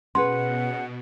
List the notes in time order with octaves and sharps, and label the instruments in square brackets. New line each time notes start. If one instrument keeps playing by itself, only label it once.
[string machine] B2 [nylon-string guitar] C#4 G#4 B4 [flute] F#5 [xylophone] C6